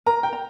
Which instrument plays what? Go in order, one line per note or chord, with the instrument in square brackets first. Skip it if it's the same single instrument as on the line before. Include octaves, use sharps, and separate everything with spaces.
[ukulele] A#4 [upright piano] A#5
[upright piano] G5
[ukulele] A#5